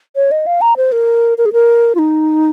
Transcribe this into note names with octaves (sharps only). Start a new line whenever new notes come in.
C#5
D#5
F5
A#5
C5
A#4
A#4
G#4
A#4
F4
D#4